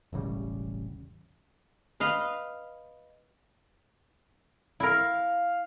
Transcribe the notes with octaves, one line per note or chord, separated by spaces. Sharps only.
E1 A1 C#3 G3
B4 D#5 F5
E4 A#4 F5